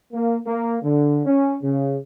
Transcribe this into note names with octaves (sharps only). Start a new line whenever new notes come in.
A#3
A#3
D3
C#4
C#3